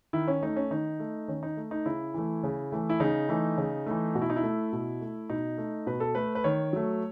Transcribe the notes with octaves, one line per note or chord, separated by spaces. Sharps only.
D#3 E4
C#4
A3 D#4
C#4
D#3 D#4
A3
D#3 C#4
D#4
A3
D#4
C#3 E4
E3 A3
C#3
E3 A3
E4
C#3 D#4
E3 A3
C#3
E3 A3
B2 F#4
E4
D#4
E4
A3
B2
A3
B2 D#4
A3
B2 B4
A4
A3 B4
B4
D#3 C#5
F#3 A3